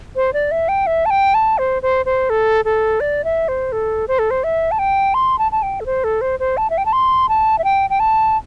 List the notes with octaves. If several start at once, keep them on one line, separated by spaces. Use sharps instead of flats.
C5
D5
E5
G5
E5
A5
G5
A5
C5
C5
C5
A4
A4
D5
E5
C5
A4
C5
A4
C5
E5
A5
G5
C6
A5
A5
G5
A4
C5
A4
C5
C5
A5
E5
G5
A5
C6
A5
E5
G5
G5
A5